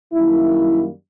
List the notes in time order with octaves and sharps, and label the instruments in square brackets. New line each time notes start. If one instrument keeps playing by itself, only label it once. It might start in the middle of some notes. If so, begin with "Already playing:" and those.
[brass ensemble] F#2 D#3 G3 A#3 E4